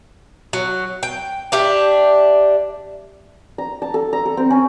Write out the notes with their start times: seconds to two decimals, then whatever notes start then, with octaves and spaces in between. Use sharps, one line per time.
0.53 F#3
1.03 G5
1.52 D4 G4 E5
3.58 A#5
3.82 A5
3.94 A4
4.13 A#5
4.26 A4
4.37 C4
4.50 C#4